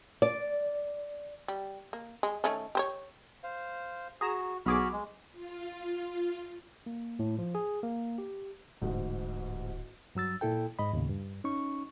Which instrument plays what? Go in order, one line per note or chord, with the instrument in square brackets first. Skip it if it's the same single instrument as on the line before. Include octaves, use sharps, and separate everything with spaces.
[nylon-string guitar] D5
[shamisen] G3
A#3
G#3
D#3 A3 C#4
G4 C5 C#5
[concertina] C5 F5
[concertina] F#4 [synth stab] G#4 A#5 E7
[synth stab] B1 G#4 D6 [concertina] F#4 B5 F6
[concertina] G#3
[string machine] F4
[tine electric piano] A#3
A2
F3
G#4
A#3
G4
[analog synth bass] D1 [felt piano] A1 D2 G#2
[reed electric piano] G2 F#3 E6 A6
A#2 E4 A4 G5
G#2 D#5 B5
D#2 A2 C#3
G2
C#4 D#4 C#6